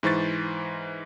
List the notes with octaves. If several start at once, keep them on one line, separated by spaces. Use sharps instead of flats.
G#2 E3 C5 C#6 A6